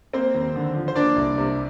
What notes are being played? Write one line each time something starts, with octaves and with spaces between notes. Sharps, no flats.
A#3 C4 C5
D#2
D3
F3
C5
A#3 D4 D5
C2
C3